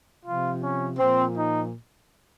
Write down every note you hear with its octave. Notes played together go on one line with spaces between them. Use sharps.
C3 F3 F4
C#4
A#2 F3 C4
D#4